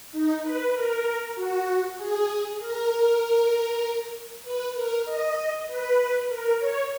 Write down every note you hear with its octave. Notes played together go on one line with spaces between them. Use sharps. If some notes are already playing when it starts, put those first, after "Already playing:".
D#4
B4
A#4
F#4
G#4
A#4
B4
A#4
D#5
B4
A#4
C#5